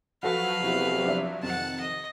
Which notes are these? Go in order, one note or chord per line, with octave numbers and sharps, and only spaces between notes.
F3 F#3 F#4 A4 B4 F5 F#5
E2 C3
D4 E5
F2 C3 D#3 F#5 A5
D#5